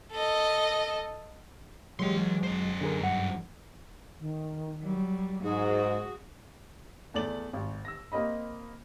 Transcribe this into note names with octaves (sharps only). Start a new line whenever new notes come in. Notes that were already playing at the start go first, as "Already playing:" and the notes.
A4 D#5
E3 F#3 G#3 G4 C6
F#3 G#3
F#2 C5
D3 G#4 A#4
G2 F#5
D#3
F#3 G3
G#2 D#4 F#4 G#4
E2 A3 D5 F#7
G#1
E6 A#6
A#3 C4 D#5 B5